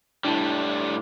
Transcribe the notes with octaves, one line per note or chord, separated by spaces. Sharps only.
A2 G3 D4 E4 A5